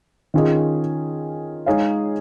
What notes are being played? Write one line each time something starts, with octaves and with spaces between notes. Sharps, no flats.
D#3 C#4 F4 G#4 D#5
G#3 D#4 G#4 C#5 F5